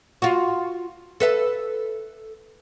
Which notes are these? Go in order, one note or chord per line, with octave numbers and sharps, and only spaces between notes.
F4 F#4
A4 B4 E5